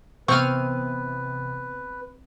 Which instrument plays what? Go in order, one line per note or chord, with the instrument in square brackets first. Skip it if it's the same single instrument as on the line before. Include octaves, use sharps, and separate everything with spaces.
[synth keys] C3 E3 B3 [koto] C4 [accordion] B4 [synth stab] C#6 F6 D#7